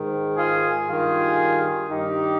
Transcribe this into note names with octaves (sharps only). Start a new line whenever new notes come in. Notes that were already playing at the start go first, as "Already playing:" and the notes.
Already playing: G#2 D#3
F4 G#4
G2 D#3 F4 G#4
G2 D#3 D#4 G4